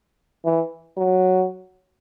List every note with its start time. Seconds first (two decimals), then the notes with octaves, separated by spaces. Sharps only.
0.45 E3
0.98 F#3